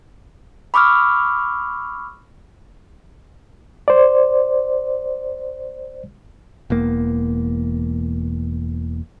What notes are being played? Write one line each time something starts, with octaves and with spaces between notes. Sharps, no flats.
B5 C#6 D6 E6 F6
C5 D5
E1 E2 A#3